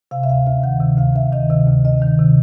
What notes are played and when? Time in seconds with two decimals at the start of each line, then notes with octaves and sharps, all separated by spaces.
0.11 C3 F5
0.23 E5
0.29 D2 F5
0.47 D2 E5
0.63 D#3 F#5
0.80 C3
0.98 D2 F5
1.15 D2 E5
1.32 D#3 D#5
1.50 C3 D#5
1.68 D2
1.85 D2 D#5
2.02 D#3
2.19 C3